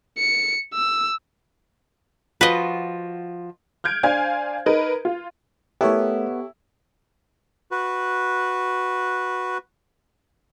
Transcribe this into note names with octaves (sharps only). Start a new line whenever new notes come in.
C#7
E6
F3 F4 F#4 B4 D#5
F6 G6 G#6 D7
D4 C5 F5 G#5 G#6
D#4 A#4 B4
F4
A3 B3 E4 G4 A4 A#4 C#5 F#5
F#4 B4